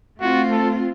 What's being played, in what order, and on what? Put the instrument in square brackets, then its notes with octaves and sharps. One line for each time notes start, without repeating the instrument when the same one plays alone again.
[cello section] A3 C4 F4 [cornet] F#4
[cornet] A4